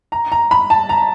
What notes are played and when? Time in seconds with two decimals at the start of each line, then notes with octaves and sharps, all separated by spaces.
0.12 A#5
0.32 A#5
0.51 B5
0.70 A5
0.89 A#5